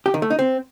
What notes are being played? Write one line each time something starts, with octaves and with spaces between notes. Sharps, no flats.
G4
D#3
A3
D#4
C4